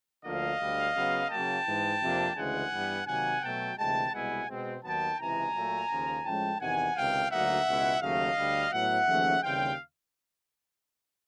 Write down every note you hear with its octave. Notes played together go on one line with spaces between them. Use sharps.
D2 D3 F3 A#3 D#5 F5
D2 D3 G3
C#3 F#3 B3
C#3 F#3 A#3 G5 A5
G#2 E3 G#3
F2 C3 F3 A#3 D4
D2 C#3 E3 G#3 F#5 G#5
G2 E3 G3 B3
C3 D#3 F#3 A#3 F#5 G#5
B2 F#3 A3 G5 A5
D2 C3 E3 G#3 G5 A5
C2 B2 G#3 B3 E4 F#5 G#5
B2 G#3 C4
D#2 D#3 F#3 B3 G5 A5
C#2 C3 E3 G#3 G#5 A#5
A#2 F#3 A3
D#2 C#3 F3
A2 F3 G#3 C#4 G5 A5
E2 C3 D#3 F#5 G#5
C#2 C3 D#3 F5 G5
D2 D3 F#3 A#3 D#4 E5 F#5
C#2 B2 G#3 C#4 E4
D#2 C#3 F#3 A3 D#5 F5
D2 D3 G3
A2 F#3 B3 E5 F#5
D#2 C#3 F3 A3 C#4
D#2 C#3 E3 G3 C4 F5 G5